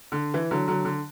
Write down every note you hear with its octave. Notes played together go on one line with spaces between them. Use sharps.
D3
E3
D3 F#3
D3 F#3
D3